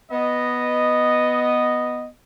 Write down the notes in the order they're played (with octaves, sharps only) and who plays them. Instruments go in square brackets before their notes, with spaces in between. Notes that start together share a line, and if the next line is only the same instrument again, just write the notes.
[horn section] B3 D#5